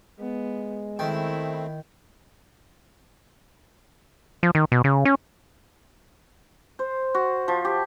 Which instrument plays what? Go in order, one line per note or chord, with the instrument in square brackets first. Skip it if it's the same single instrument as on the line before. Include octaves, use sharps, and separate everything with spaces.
[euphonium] G#3 [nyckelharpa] B3
[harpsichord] D#3 [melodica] A3 C4 [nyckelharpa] E4 B5
[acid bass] F3
D#3
B2
C#3
C#4
[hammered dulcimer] C5
F#4
F3
G4